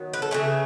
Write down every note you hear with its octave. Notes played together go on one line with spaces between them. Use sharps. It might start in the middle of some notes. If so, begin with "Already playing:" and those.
Already playing: D#3 F#3 B3
B4
A4
C#3 E3 A3 G#4